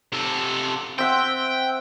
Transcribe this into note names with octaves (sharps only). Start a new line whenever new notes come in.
C3 A4
C4 E5 F#5 G5